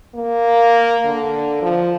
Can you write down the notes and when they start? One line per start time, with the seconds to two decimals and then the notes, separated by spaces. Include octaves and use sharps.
0.15 A#3
1.05 D3
1.62 F3